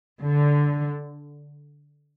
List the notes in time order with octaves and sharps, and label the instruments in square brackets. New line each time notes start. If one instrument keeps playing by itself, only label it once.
[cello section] D3